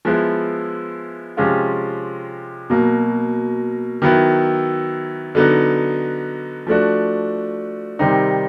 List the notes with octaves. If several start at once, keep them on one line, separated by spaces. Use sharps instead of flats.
F3 G#3 B3 E4
C3 F3 G#3 C#4 F4
B2 F#3 A#3
D#3 F#3 B3 E4
D3 F#3 B3 D#4
F3 A3 D4 F#4
C3 D#3 G3 C4 D#4